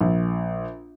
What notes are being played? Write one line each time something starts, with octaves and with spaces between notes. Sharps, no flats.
A#1